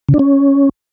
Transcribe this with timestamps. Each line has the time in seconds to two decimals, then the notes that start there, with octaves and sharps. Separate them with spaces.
0.09 C#3
0.14 D4
0.19 C#4